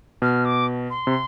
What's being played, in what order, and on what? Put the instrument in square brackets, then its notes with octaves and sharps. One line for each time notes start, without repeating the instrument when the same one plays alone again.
[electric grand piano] B2 [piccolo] F6
[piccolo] D6
C6
[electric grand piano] C3